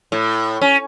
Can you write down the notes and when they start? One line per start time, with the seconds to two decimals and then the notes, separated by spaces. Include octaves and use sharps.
0.12 A2
0.61 C#4